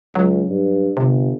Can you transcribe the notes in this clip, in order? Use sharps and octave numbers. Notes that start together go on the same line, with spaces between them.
C#2 F#3
G2
G1 C3